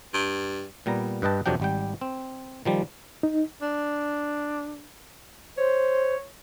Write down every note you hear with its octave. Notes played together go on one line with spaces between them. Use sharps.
G2
A#2 G3 B3 A#5
G2 B4 D#5 G5 A5
F2 C3 F#3 D4 G5
G#1 G3 G5
C4
D#3 F3 G3
D#4
D4
C5 C#5